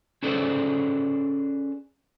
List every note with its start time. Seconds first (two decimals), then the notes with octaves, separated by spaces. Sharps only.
0.23 C#4 G#4 A4 B4 C5 D5